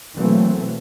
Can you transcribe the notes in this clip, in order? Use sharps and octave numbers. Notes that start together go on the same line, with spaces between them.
B2 E3 F#3 A3 A#3 C4